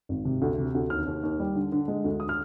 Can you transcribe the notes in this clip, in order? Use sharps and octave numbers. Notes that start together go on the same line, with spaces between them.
G#1
C3
D2
C3
D2
D#2 F6
D#2
D#2
G3
D3
D3
G#3
D2
D#6
F6